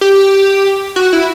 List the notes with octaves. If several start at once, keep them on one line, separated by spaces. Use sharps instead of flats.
G4
F#4
E4